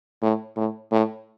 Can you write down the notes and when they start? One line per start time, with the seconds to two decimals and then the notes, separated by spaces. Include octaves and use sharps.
0.22 A2
0.57 A2
0.92 A2